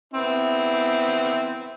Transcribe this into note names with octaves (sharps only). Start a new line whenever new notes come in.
B3 C4 E4